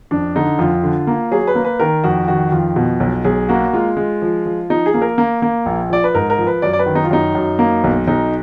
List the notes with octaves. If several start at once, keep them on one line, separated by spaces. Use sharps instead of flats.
F2 D4
D3 D#4
F2 F4
D3
A#3
F#3 G#4
B4
A#3
B4
D#3 A#4
F2 F#4
D#3 F#4
F2 F4
B2
B1
B1 G#4
A#3 F#4
G#3 F4
G#3
F3
F3
F3 D#4
G#4
A#3
A#4
A#3
A#3
A#1
F3 D5
B4
G#2 A#4
A#4
F3
B4
F#2 D5
D5
B4
D#3
D#4
F4
F#2 D#4
F#2
A#3
B1
B1 D#4